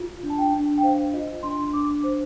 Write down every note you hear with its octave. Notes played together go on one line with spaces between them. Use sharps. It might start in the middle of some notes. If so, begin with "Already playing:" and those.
Already playing: F4
D4
A5
G5
D4
G5
C5 F5
F4 D#5
D4 C6
D4 D6
C5